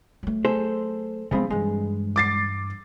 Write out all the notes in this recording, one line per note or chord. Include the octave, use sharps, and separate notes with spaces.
F#3 A3
G#4 A4 C5
C#3 F3 G#3 B3 C4
G2 E3 G#3
D6 A6 C7